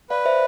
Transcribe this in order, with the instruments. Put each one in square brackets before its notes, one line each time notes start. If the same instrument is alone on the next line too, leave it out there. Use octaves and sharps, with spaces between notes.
[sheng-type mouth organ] B4 [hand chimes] D5 F5
[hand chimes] C5 E5